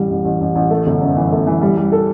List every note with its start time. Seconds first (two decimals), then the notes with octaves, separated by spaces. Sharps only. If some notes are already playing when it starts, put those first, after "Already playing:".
Already playing: A1 G3
0.10 A1
0.25 A1
0.41 A1
0.55 A1
0.70 A3
0.86 G1
1.01 F#2
1.16 E3
1.32 A3
1.47 E3
1.61 G3
1.77 G3
1.92 A4